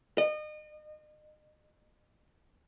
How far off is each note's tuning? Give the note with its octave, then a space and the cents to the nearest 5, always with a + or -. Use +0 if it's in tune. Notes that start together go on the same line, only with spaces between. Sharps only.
D#5 -35